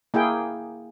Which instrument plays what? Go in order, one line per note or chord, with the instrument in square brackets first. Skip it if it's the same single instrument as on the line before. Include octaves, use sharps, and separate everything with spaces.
[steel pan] A#3 E4 G#4 G5